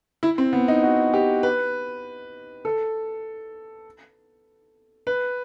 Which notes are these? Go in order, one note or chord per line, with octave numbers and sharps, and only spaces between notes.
E4
C4
B3
D#4
F#4
G4
B4
A4
B4